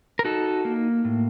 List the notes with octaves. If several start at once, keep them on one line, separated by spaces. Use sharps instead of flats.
A#4
D#4 F#4 A4
A#3
A2